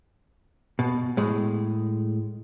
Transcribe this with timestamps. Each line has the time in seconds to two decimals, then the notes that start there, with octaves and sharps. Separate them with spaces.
0.79 B2
1.17 A2 G#3